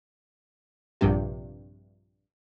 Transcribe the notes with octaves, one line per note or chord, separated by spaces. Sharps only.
A#1 G2 C3